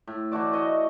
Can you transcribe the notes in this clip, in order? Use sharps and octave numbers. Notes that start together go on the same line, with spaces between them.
A2
E3 A3 F#4 D5
F#4 D#5